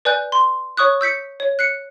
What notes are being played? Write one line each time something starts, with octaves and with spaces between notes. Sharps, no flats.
B4 D5 G#5 F#6 G6
C6
C#5 C#6 D#6 F#6
E6 G6 B6 C#7
C#5
F#6 C7 C#7